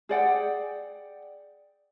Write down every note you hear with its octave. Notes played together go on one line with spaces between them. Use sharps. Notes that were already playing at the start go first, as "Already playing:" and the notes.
G#4 D5 F#5 G5